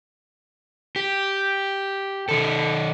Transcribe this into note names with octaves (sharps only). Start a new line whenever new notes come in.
G4
D#3 A4